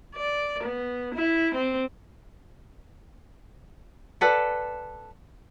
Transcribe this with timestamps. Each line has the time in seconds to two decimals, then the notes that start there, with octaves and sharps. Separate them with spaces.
0.15 D5
0.63 B3
1.15 E4
1.55 C4
4.21 A4 B4 D5 F#5